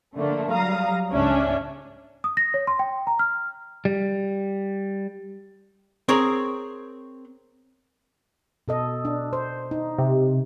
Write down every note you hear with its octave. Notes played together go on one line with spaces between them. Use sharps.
D3 F3 A3 A#3
F#3 G3 F5 A#5 D#6
C#2 G#2 C#4 D4 E5
D#6
A#6
C#5
C6
G5
A#5
F6
G3
C4 G#4 A#4 C#5
B2 A4 D#5
D4
C5
D#4
C3